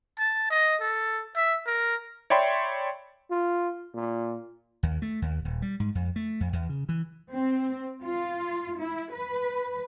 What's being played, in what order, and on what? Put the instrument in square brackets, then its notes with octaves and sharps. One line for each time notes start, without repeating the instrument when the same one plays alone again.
[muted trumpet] A5
D#5
A4
E5
A#4
[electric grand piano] C#5 D5 E5 G5 B5 C6
[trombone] F4
A#2
[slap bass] D#2
A3
D#2
D#1
G3
G#2
F2
A3
F2
E2
C#3
E3
[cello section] C4
F4
E4
B4